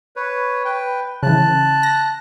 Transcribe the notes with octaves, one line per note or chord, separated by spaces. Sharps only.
B4 C#5
B4 G5
C#3 E3 A5 F#6
A#6